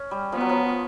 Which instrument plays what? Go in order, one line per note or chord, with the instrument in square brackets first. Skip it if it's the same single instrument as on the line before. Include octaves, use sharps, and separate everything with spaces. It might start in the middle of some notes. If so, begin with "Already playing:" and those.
Already playing: [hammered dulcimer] C#4
G3
[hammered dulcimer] F3 [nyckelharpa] B3
[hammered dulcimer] F#3
F3